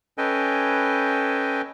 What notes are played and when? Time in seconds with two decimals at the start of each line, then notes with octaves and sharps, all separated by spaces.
0.18 C#4 A4 B4 D#5 G5 G#5